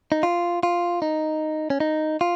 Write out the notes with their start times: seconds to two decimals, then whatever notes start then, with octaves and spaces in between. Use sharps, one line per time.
0.12 D#4
0.23 F4
0.63 F4
1.02 D#4
1.70 C#4
1.80 D#4
2.21 F4